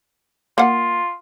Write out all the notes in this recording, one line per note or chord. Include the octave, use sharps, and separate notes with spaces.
A#3 F4 F#5